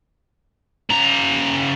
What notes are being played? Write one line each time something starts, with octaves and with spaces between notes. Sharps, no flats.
C#3 A#5